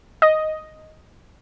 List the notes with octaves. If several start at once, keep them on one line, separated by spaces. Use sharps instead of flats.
D#5